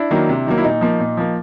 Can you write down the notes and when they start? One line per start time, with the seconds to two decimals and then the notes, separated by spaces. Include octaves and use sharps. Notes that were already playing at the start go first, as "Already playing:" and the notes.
Already playing: D4 E4
0.11 D#3 F#3 A#3
0.29 C3
0.47 D#3 F#3 A#3
0.58 E4
0.64 A#2 D#4
0.81 F3 A#3
1.00 A#2
1.17 F3 A#3